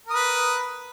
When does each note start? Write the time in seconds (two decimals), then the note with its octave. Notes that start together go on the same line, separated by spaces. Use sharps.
0.06 A#4
0.10 D#6
0.14 B4